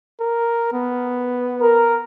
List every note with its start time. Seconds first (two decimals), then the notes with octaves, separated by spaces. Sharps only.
0.20 A#4
0.72 B3
1.62 A#4